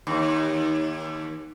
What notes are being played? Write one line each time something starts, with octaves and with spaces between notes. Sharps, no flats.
D#2